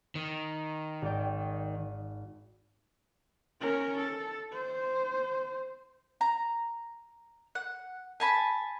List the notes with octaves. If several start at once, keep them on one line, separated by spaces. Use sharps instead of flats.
D#3
G#1 D5 G5
C#4 A#4
A4
C5
A#5
F#5
G#5 A5 B5